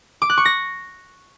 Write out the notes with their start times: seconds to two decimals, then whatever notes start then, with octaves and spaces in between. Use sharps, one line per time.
0.22 D6
0.30 F#6
0.38 C#6
0.45 A#6